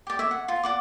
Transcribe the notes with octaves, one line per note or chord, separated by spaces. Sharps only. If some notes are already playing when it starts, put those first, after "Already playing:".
G4 D5
C#5 E5
F#5
F4
D5 F#5 D6